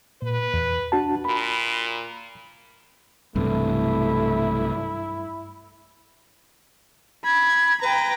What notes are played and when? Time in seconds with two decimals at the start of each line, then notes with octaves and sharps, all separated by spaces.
0.22 A#2 B4
0.54 E2
0.92 D4 F#4 A5
1.25 A#2 B5
3.36 B1 G2 C3 E3 A3 E4
7.24 B5 G#6
7.82 B4 G5 A#5